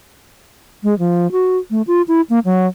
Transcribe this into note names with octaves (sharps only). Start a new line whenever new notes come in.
G#3
F3
F#4
A3
F4
E4
A#3
F#3